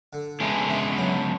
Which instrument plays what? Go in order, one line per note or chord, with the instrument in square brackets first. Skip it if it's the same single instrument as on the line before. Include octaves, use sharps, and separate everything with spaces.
[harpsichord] D3
[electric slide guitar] C#3 G#3 B3 D4 [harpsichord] E3
[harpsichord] E3
F#3